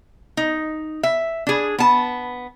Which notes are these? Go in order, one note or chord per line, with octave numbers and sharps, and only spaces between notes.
D#4
E5
D4 G#4
B3 A5